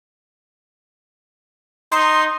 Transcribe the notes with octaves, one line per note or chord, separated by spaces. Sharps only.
D#4 C6